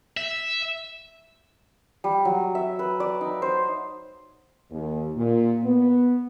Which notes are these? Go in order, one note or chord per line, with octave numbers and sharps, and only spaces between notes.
E5
G3
F#3
E5
B4
D5
D#4
C5
D#2
A#2
B3